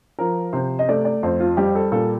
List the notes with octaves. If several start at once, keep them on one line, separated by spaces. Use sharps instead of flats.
F3 A#4
C3 C5
D#5
A3 D5
D5
F2 C5
F4
G3 G4
A4
A#2 A4